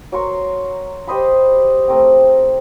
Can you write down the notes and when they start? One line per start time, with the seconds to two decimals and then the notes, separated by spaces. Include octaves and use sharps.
0.12 F#3 A#4 C6 C#6
1.07 G4 C5 D#5 B5
1.88 A3 C4 A#4 G5